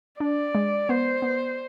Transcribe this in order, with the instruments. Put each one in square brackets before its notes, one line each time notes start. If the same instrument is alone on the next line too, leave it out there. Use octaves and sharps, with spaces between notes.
[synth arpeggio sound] D4 [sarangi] D5
[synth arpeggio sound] G#3
[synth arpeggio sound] B3 [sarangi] C5
[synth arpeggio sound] B3